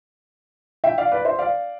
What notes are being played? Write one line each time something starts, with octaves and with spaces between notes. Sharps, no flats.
E5 G5
D5 F5
B4 D5
C5 E5
D5 F5